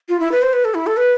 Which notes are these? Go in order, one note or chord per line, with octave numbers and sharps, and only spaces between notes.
F4
E4
B4
C5
B4
A4
E4
A4
B4